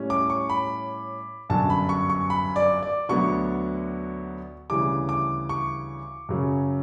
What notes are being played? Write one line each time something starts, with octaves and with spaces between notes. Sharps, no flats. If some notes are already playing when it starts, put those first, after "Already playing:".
Already playing: A2 G3 C#4
D6
C#6
B5
G1 F#2 D3 A5
B5
C#6
C#6
B5
D5
D5
D2 D3 F#3 B3 D4 C#6
D2 C#3 E3 G3 D6
D6
C#6
F#2 C#3 F#3